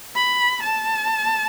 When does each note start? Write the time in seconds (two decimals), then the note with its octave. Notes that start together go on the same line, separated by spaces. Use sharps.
0.16 B5
0.62 A5